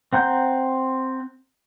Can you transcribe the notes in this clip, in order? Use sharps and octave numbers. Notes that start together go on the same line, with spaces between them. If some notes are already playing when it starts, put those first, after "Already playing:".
C4 F#5 A#5 G6